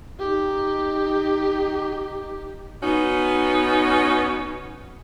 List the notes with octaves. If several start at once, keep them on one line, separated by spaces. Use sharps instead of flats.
D#4 G4
B3 C#4 D#4 F#4